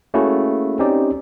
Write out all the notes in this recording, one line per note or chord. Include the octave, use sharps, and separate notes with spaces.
A3 A#3 C#4 E4 F#4 G#4
C4 C#4 D#4 G4 D5